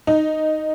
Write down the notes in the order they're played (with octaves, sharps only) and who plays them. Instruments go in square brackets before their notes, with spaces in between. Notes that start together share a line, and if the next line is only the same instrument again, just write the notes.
[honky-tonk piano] D#4